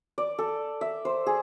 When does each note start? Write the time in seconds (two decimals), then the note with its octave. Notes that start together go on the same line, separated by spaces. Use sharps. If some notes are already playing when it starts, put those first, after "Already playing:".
0.18 D5
0.39 A4
0.81 E5
1.05 C5
1.26 G#4